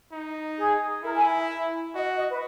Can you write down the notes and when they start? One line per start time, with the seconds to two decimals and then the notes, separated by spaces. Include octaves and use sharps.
0.12 D#4
0.58 G#4
1.04 E4 A#4
1.16 G#5
1.38 E5
1.95 F#4 D#5
2.18 D#5
2.30 B4